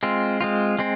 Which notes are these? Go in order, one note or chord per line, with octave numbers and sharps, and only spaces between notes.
G#3 C4 F4
G#3 C4 F4
G#3 C4